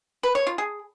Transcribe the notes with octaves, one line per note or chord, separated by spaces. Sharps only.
B4
C#5
F4
G#4